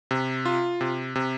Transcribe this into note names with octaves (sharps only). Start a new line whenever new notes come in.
C3
F4
C3
C3